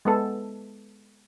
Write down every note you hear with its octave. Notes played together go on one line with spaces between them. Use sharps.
G#3 B3 A4